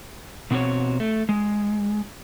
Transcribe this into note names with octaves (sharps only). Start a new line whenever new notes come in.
B2 C4 F#4 A#4 C#5
A3
G#3